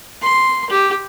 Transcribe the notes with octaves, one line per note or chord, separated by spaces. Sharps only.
C6
G4